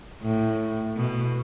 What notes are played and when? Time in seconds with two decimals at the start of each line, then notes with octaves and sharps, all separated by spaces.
0.21 A2
0.96 B2